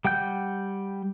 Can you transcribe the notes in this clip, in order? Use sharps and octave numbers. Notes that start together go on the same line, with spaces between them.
G3 F#5 G5 G6